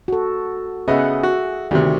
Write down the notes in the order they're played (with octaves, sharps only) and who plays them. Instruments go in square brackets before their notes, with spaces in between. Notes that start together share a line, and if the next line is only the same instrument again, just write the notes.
[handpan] F#4 A4
[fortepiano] C#3 B3 D#5 [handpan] G#4 E5 F#5
[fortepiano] F#4
[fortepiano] D2 C3 [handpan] D#3 F#4 G4